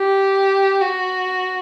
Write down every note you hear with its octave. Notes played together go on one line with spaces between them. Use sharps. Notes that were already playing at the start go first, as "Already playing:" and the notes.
Already playing: G4
F#4